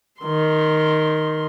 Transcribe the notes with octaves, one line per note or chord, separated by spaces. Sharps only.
D#3 C6